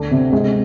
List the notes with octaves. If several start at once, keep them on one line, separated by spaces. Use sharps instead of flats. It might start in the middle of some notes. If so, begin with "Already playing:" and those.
Already playing: D2 D4
C3
G#3